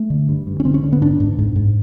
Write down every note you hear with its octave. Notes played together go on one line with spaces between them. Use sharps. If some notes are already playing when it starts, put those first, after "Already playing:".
Already playing: A3
D3
G2
G2
C#4
D3 C4
C#4
D3
B3
G#2 D4
G#2
G#2
G#2